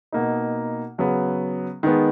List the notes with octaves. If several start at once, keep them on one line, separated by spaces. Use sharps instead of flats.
B2 A#3 D#4
C#3 F#3 B3
D#3 G#3 B3